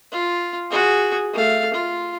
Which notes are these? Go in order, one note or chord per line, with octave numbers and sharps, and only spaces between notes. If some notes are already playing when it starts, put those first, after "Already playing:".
F4
F#4 G#4
A3 F5
F4